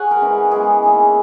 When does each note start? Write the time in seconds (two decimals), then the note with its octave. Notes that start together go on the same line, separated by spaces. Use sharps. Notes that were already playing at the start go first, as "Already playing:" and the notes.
Already playing: G#4 C#5 F#5 G#5
0.11 A#4
0.21 E3 G#3 C#4
0.51 E3 G#3 B3 E4 G#4
0.83 D#3 A#3 E4